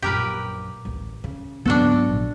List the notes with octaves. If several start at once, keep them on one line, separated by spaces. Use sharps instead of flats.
A#1 F#2 G4 A#4 B4
A1 D2
C#3
D2 G#2 F#3 B3 D4 F#4 A4
A#1